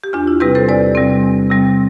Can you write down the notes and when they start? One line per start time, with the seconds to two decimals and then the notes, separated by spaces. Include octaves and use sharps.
0.04 G4
0.13 E2 D4 F4
0.27 E4
0.40 C3 G3 C4 G4 B4
0.55 A4 C5
0.68 E2 B4 D5
0.95 C3 G3 C4
1.23 E2
1.50 C3 G3 C4